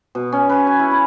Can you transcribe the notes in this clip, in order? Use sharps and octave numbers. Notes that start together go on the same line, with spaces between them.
B2
C#4
B4
G#5
E4
B5